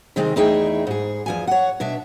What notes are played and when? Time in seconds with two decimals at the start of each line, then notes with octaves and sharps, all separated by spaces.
0.16 C3 D#3 G#3 C4
0.36 E2 A3 D#4 E4 G#4 G5
0.87 G#2 G#4
1.26 E2 F3 G#5
1.47 C#5 F#5
1.80 B2 D4 E5